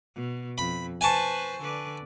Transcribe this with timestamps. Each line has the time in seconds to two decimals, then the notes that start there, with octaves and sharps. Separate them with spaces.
0.15 B2
0.58 F2 B5
1.01 B4 C5 G#5 A5 C#6
1.60 D3 B4 D5